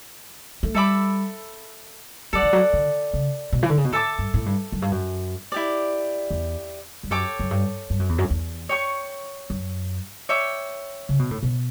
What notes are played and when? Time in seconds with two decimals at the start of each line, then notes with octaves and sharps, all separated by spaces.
0.63 A3
0.75 G3 A4 E5 B5 D6
2.33 F#3 A4 D5 F#5
2.43 E3
2.53 F#3
2.73 D3
3.14 C#3
3.53 B2
3.63 E3
3.70 D3
3.78 C#3
3.84 B2
3.92 A2 A4 E5 A5 D6
4.19 G2
4.34 A2
4.46 G2
4.72 F#2
4.82 G2
4.91 F#2
5.52 E4 G4 D5
6.31 E2
7.03 G2
7.10 F#2 A4 C#5 G5 D6
7.39 F#2
7.51 G2
7.90 G2
7.99 F#2
8.09 E2
8.18 F#2
8.30 E2
8.69 C#5 G5 C#6
9.50 F#2
10.29 C#5 E5 G5 D6
11.09 C#3
11.19 B2
11.31 A2
11.43 B2